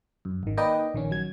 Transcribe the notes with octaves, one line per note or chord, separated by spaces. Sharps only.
F#2
G#1 D#3
A#3 D#4 B4 D5 D#5 G5
A#1 D#3 C#4
F#3 G#6